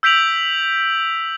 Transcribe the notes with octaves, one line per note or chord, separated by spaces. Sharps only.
E6 G6 B6 D7 F7 F#7